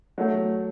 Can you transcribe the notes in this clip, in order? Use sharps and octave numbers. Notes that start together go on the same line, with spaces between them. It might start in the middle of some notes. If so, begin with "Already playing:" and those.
F#3 A3